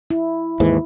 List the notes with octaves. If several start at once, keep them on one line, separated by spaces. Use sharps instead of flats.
E4
D#2 G#2 E3